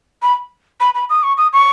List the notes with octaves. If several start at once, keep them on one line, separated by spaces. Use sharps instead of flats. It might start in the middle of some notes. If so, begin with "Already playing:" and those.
B5
B5
B5
D#6
C#6
D#6
C#6